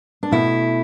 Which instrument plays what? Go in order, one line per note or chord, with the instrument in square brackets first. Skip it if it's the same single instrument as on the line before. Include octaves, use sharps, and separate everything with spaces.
[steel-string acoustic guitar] D4
B2 A3 E4